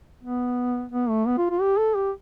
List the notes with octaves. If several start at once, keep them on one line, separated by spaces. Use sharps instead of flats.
B3
B3
A3
B3
F4
F4
G4
A4
G4